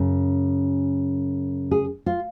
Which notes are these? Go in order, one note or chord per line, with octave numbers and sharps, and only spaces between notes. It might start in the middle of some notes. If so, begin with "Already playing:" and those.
Already playing: F#2 C#3
G#4
F4